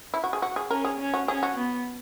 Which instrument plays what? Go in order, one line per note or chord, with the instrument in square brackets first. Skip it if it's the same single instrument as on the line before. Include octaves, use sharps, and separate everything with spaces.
[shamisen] E4
F#4
G#4
F#4
G#4
[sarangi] C#4 [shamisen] A#4
[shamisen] G#4
[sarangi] C#4
[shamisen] F#4
[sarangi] C#4 [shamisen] G#4
[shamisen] F#4
[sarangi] B3